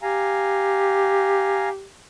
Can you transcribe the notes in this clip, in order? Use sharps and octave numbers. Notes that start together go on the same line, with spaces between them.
G4 F5 G#5 A#5